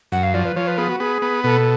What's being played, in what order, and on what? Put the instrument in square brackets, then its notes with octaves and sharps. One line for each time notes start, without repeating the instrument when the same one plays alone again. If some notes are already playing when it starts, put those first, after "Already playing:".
[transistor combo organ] F#2 [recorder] F#5
[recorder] F5
[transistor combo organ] F3 [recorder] D5
[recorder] B4
[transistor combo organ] F3 [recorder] C#5
[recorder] B4
[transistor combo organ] B3 [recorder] G#4
[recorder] F#4
[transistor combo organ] B3 [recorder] G#4
[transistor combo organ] B3
[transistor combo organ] B2 [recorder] A4